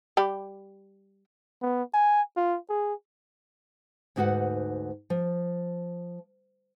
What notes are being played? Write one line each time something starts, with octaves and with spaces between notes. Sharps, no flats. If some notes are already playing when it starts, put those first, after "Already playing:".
G3 G4 B5
B3
G#5
F4
G#4
D2 G#2 D#4 F#4 B4 F#5
F3